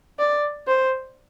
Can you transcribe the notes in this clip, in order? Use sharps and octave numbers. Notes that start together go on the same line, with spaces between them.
D5
C5